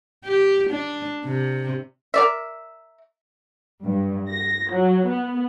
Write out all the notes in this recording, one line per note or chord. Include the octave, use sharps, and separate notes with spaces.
G4
D4
C3
A#4 D5 E5
G2
A#6
F#3
B3